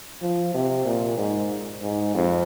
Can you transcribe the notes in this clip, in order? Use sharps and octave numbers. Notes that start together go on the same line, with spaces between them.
F3
C3
A#2
G#2
G#2
F2